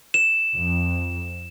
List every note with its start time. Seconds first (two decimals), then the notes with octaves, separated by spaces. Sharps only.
0.14 E7
0.54 F2